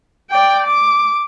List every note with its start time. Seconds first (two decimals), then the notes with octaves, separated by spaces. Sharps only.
0.31 D5 G5
0.66 D6